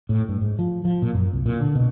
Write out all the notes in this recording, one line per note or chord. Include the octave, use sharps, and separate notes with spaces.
A2
G2
G#2
F3
F3
A#2
F#2
C2
A#2
D3
B2